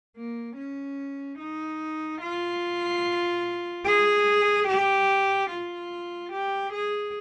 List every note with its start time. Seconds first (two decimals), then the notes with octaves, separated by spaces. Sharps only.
0.17 A#3
0.57 C#4
1.40 D#4
2.21 F4
3.85 G#4
4.67 G4
5.50 F4
6.32 G4
6.73 G#4